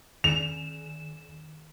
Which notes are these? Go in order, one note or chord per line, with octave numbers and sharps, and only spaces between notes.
D#3 E7 F7